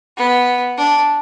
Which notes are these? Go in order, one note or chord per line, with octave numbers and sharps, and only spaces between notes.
B3
D4